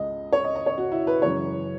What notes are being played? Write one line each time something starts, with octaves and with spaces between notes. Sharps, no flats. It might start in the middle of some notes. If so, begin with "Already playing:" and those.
Already playing: C#2 C#3 G#3 D#5
C#5
D#5
D#5
C#5
F#4
E4
B4
F#2 C#3 E3 G#3 C#5